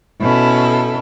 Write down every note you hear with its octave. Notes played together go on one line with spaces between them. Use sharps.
B2 C#4 E4 A4